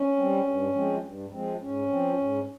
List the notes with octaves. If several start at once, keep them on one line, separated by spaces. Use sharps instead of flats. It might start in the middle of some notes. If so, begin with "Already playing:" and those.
Already playing: C#4
G3 C4
G2
F3 G#3 C4
G2
F3 G#3 C4
G#2 C#4
F3 C4
G#2